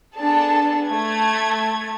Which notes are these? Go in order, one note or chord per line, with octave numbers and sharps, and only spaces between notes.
B3 D4 G#4 A4 A5
A3 G#6